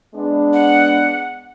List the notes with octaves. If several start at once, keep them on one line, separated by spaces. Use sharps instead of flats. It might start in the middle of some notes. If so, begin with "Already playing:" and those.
G#3 B3 D4
F#5